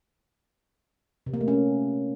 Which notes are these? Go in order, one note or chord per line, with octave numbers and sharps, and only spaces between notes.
C3
A#3
A3
C#4